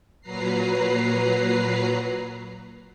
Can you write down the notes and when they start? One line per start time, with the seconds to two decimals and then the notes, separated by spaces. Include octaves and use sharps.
0.21 A#2 F#3 B4 A#5 C7